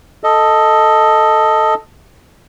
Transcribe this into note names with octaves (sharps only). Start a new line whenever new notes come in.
A4 D#5